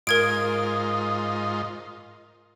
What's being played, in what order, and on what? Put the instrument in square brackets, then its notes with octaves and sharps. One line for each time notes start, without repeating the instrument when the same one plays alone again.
[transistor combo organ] G#2 F4 D#5 [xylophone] A#4 G#6 D7